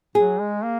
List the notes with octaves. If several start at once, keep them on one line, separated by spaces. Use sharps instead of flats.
F#3 G#4
G#3
A#3